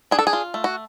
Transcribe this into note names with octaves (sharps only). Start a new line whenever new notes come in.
D4 G#4
A4
G#4
F4
A3
F#4